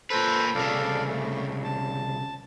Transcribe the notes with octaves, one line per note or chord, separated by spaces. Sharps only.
A#2 A4 B4 C5
C2 C#3 A4 D5 F5
A3
A5